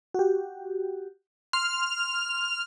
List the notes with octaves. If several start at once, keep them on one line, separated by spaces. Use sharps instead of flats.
F#4 G4
C6 F6